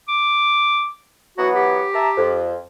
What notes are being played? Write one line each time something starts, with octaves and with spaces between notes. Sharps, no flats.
D6
E3 F#3 B3 F#4
G4
E5 A5 A#5
F2